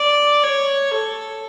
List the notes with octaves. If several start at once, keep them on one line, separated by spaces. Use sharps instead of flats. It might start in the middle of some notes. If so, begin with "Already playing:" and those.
Already playing: D5
C#5
A4